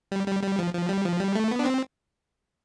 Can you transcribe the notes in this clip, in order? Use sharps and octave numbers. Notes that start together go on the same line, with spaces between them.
G3
G3
G3
F3
F3
G3
F3
G3
A3
B3
D4
C4